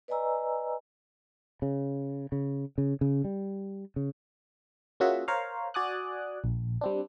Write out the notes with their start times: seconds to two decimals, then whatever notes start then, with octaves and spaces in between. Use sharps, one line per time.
0.08 B4 D5 D#5 G#5 A#5 E6
1.62 C#3
2.32 C#3
2.78 C#3
3.01 C#3
3.24 G3
3.96 C#3
5.00 A#3 C#4 F4 F#4 G#4 E5
5.28 A#4 C5 C#5 F5
5.74 F#4 D5 G#5 D6 D#6 F#6
6.44 A#1
6.81 G3 C4 D4